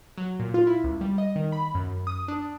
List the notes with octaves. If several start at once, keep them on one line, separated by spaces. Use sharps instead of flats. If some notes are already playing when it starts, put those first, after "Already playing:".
F#3
A#2
F4
E4
C#2
G3
D#5
D#3
B5
F#2
D#6
D4